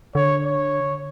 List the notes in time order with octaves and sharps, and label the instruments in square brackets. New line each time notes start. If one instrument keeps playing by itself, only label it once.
[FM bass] D3 [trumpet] C#5
[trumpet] C#5